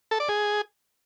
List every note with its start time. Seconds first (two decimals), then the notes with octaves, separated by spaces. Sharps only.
0.11 A4
0.20 D5
0.29 G#4